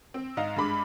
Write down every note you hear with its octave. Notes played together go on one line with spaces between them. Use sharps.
C4
G#2 D#5 F5
G2 G#3 B5 D6